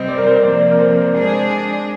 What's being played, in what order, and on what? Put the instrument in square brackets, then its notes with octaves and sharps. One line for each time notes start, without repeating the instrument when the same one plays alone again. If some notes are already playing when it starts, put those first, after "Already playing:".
Already playing: [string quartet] C3 G3 C4 [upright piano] C5 D#5
[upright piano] D5
A#4
C5
[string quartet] C3 F3 A#3 [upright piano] D5
[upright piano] A#4
C5
A#4
[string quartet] G#3 D4 G#4 [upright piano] C5